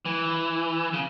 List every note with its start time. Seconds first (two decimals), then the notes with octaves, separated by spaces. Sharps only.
0.06 E3
0.93 C#3